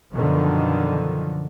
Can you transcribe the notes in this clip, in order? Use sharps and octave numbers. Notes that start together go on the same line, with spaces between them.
F#2 B2 D3 D#3 F3